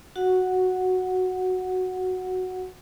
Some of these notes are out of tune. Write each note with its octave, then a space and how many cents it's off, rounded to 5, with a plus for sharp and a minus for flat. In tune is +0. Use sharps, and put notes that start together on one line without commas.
F#4 +0 F#5 -5